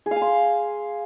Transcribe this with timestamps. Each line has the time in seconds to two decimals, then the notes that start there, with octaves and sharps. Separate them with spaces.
0.06 G#4
0.11 F5
0.16 G#5
0.21 C6